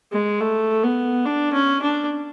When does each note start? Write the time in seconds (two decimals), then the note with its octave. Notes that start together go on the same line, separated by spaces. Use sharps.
0.12 G#3
0.40 A3
0.83 B3
1.26 D4
1.53 C#4
1.82 D4